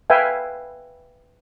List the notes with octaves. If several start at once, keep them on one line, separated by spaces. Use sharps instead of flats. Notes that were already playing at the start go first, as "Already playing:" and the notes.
B4 E5 F5 G5 G#5